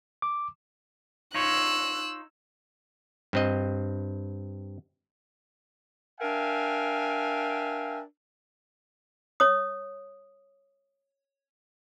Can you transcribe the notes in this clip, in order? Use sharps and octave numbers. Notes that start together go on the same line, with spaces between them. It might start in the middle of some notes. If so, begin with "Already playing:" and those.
D6
D#4 F4 C#5 E6 F#6
G2 C4 D#5
D4 A#4 E5 F5 G5 G#5
C#5 D#6